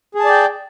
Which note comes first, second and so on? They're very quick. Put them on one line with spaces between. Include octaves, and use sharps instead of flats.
G#4 A5 D5 G5